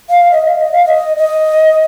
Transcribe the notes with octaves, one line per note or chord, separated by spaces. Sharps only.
F5
D#5
F5
D#5
F5
D#5
D#5